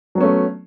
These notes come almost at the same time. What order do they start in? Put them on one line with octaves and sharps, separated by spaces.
F#3 B3 C#4 A3